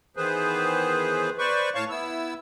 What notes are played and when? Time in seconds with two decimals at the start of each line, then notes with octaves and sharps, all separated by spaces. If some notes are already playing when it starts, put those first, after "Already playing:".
0.17 D#3 E3 B3 G#4 B4 C5
1.38 B4 C5 D5 C#6
1.75 A2 C#5 F5 A5 C#6
1.90 B3 E4 E6